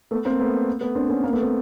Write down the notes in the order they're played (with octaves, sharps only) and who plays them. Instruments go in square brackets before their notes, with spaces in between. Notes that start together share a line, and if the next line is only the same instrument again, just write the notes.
[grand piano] A3 B3
A#3 C4
A3 B3
A3 B3
C4 D4
B3 C#4
A#3 C4
A3 B3
A#3 C4